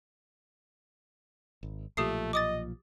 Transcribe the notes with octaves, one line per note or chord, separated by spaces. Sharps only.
G#1
B1 A#2 F3 A3 G4 D#6 C7
D#5 D6 D#6 A6